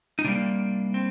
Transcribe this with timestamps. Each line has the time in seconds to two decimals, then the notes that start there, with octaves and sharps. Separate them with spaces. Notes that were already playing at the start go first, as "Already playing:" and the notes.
0.19 D#4
0.24 C3 G3 A#3 D4
0.94 C4